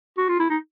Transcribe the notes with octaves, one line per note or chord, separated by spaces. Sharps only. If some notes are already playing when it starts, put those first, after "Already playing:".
F#4
F4
E4
D#4